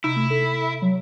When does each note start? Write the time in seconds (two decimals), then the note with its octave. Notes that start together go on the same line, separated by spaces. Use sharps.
0.04 C3 D#4 E4
0.16 A3
0.30 A4
0.82 F#3